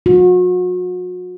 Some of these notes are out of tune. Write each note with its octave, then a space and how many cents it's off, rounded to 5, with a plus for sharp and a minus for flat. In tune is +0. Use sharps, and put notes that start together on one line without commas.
F#4 -40